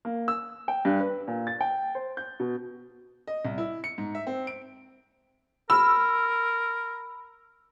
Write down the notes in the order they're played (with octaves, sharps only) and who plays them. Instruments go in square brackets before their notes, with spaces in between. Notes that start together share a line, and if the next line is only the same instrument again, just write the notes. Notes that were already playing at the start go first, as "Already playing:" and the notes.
[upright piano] A#3
E6
G5
G2
B4
A#2
A6
G5
C5
G6
B2
[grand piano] D#5
C2
E4
C#7
G#2
E5
C4
D7
[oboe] A#4 [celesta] B5 F6 [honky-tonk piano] E6